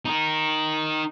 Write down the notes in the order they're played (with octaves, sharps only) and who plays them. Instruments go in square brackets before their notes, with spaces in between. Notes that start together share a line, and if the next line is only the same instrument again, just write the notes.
[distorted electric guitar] D#4 A#4